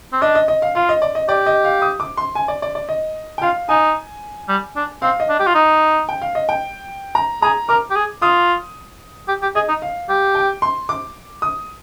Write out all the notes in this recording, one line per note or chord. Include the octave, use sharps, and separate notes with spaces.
C4
D4 D#5
D#5
D#5
F5
F4 F5
D#5
D5
D#5
G4 D5
D#5
F5
D#6
D6
C6
G#5
D5
D5
D5
D#5
G5
F4 F5
D#4 G#5
G3
D4
C4 F5
D#5
D4
G4
F4
D#4
G5
F5
D#5
G5
A#5
G#4 A#5
A#4 D6
G4
G#4
F4 D#6
G4
G4
G#4 D#5
D#4
F5
G4
G5
C6
D6
D#6